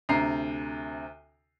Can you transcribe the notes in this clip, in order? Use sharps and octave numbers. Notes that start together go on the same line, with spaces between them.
D2 C3 A#5 C7